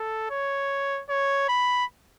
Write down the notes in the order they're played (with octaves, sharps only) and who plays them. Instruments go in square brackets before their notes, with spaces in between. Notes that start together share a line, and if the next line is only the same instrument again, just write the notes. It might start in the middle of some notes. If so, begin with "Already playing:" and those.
Already playing: [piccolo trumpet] A4
C#5
C#5
B5